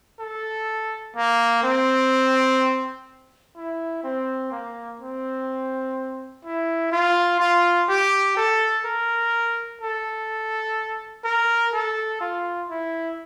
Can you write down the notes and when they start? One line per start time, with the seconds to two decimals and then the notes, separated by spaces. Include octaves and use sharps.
0.20 A4
1.16 A#3
1.63 C4
3.56 E4
4.04 C4
4.52 A#3
5.00 C4
6.45 E4
6.92 F4
7.40 F4
7.89 G4
8.37 A4
8.85 A#4
9.81 A4
11.24 A#4
11.73 A4
12.21 F4
12.69 E4